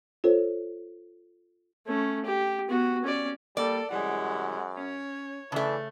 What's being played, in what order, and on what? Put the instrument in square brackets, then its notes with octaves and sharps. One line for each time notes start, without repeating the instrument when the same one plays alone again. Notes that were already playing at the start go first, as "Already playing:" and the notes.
[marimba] F4 A4 C5 C#5
[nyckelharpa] A3 C#4
G4
B3 F#4
C#4 D5
[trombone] G3 [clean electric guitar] A#3 [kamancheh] A4 [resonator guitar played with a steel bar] D5
[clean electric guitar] C2 E3 G3 [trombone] F#2 [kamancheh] G#3 F#5
[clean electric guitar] C#4 [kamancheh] C#5
[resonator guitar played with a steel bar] C#3 A3 [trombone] E3 [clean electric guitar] D5 A5